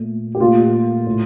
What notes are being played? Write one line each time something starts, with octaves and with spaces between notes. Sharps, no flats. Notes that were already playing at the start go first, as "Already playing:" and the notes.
Already playing: A#2 A3
G4
A#2 A3 F4
A2 A3